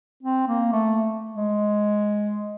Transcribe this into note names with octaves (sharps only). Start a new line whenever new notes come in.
C4
A#3
A3
G#3